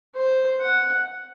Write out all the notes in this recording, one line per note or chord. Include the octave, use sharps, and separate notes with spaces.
C5
F#5